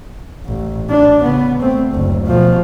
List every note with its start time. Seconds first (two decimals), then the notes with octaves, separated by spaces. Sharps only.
0.45 A1
0.90 D4
1.22 C#3 B3
1.60 A3 C4
1.92 F#1 D2
2.26 B2 F3